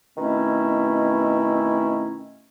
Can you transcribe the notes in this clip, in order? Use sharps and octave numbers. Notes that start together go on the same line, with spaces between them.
B2 D#3 A3 C4 C#4 E4